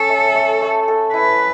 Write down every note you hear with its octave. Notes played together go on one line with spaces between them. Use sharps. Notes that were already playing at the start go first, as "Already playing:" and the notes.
Already playing: C#4 A4
A3
A3
A3
A4
E4 B4